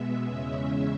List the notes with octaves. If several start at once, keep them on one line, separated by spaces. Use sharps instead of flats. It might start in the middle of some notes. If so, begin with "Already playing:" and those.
Already playing: B2 G#3 B3 E5
E2 C#3 G#3 C#4 E5